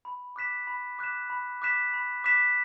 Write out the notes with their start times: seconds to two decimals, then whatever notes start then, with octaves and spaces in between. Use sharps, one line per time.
0.05 B5
0.36 D6 F#6 B6 E7
0.67 B5
0.99 D6 F#6 B6 E7
1.30 B5
1.62 D6 F#6 B6 E7
1.94 B5
2.24 D6 F#6 B6 E7